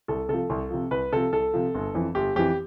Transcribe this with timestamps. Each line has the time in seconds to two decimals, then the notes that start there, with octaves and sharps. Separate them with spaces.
0.08 C2 A4
0.29 C3 F3 A4
0.50 C2
0.71 C3 F3
0.91 C2 B4
1.13 C3 F3 A4
1.32 C2 A4
1.53 C3 F3
1.74 G1
1.94 F2 E3
2.15 G1 G4
2.36 F2 E3 G4